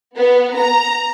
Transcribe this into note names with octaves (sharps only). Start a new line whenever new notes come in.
B3
A#5